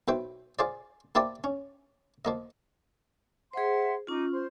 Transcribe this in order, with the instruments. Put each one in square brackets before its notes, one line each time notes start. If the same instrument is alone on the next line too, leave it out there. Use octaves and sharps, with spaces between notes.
[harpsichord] B1 E4 B4 C5 G5
F4 G#4 C5 D5
A#3 E4 G4 C5 D5 A5
C#4
F3 A#3 D#5
[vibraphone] G#4 C5 [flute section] E5 F#5 C6
[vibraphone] C#4 F4 [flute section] D#4 D6
[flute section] C5 C6